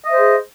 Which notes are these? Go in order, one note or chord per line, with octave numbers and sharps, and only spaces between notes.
G#4 C5 D#5 E5